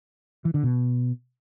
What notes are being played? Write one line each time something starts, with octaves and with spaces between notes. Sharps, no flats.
E3
D3
B2